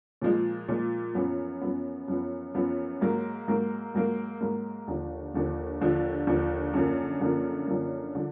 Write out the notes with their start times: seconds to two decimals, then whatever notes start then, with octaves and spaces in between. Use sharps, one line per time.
0.22 A#2 F3 G#3
0.68 A#2 F3 G#3
1.15 F#2 F3 B3
1.61 F#2 F3 B3
2.08 F#2 F3 B3
2.54 F#2 F3 B3
3.01 G#2 F#3 A#3
3.48 G#2 F#3 A#3
3.94 G#2 F#3 A#3
4.41 G#2 F#3 A#3
4.87 D#2 D3 F3
5.34 D#2 D3 F3
5.81 D#2 D3 F3
6.27 D#2 D3 F3
6.74 F#2 D3 F3 A#3
7.20 F#2 D3 F3 A#3
7.67 F#2 D3 F3 A#3
8.15 D3 F3